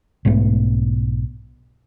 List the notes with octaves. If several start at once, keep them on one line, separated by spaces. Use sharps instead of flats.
B1 G#2 A3 B3